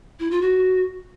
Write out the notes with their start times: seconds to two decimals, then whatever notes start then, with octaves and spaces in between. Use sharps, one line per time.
0.19 E4
0.31 F4
0.41 F#4